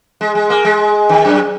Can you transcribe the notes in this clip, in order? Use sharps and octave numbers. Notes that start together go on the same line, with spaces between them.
G#3
G#3
A#3
G#3
D#3
F#2